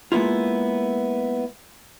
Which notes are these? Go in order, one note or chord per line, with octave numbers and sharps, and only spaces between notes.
G#3 A#3 B3 E4 F4